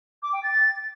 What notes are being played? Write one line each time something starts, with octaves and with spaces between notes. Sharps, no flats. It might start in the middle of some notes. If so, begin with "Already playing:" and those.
D6
G5
A6